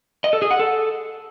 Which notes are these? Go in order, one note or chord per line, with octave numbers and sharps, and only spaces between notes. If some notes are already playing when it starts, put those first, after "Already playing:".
D#5
A4
G#4
F#5
A4